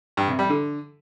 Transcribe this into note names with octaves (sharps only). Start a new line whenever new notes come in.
G2
C3
G3
D3